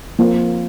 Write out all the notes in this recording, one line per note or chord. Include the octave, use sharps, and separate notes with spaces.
F3 A#3 C4 F4